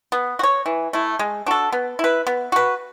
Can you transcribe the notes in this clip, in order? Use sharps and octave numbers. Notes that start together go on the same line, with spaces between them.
B3
F#4
C#5
E3
A3 E4
G#3
D4 F#4 A4
B3
E4 B4
B3
F#4 B4